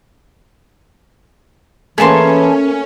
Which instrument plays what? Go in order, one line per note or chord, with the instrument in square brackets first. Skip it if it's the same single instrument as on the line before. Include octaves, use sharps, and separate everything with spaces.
[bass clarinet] E3 [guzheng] A3 A#3 [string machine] C#4 [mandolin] G#4 A5 C6